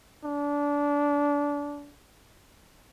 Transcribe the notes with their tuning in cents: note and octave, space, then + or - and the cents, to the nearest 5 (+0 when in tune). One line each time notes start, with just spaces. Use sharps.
D4 -25